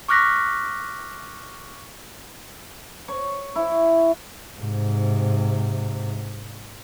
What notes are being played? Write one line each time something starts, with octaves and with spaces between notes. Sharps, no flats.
C#6 D6 F6 F#6 A#6 B6
C#5
E4
G#2 C3